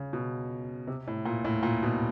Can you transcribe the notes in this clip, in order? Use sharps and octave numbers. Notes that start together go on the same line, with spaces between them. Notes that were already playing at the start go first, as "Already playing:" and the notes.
Already playing: C#3
B2
C3
A2
A#2
A2
A#2
B2